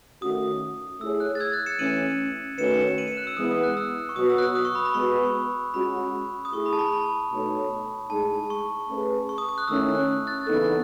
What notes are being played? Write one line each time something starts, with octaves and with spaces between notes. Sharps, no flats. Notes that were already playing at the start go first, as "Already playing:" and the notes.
D#3 A3 C#4 F#4 D#6
A3 E4 G#4 C#5 E6
F#6
A6
E6 G#6
F#6 A6
C#7 E7
E3 A3 C#4 D#7 F#7
D#3 A3 C#4 F#4 B4 C#7 E7
D#7 F#7
C#7 E7
F#6
E6
E3 G#3 B3 E4 D#6
D#6
F#6
E6
C#6
B2 F#3 B3 F#4 B4 D#6
E6
F#6
E6
D#6
C#6
B5
B5
G#3 B3 F#4 B4 C#6
G#3 C#4 F#4 B5
D#6
A3 E4 G#4 C#6
B5
A5
B5
B5
B2 A3 D#4 A4 C#5
A2 G#3 D#4 G#4 A5
C#6
A3 C#4 G#4 B4
C#6
D#6
D#6
F#6
D#3 A3 C#4 E4 E6
F#6
F#6 A6
C#3 E3 B3 D#4 A4 F#6